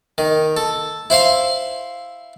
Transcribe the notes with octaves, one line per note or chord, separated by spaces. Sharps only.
D#3
A4
E4 C5 F5 C6